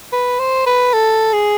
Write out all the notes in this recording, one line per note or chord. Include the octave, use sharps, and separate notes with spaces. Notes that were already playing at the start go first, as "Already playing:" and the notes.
B4
C5
B4
A4
G#4